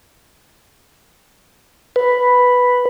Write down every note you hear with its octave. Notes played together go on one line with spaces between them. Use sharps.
B4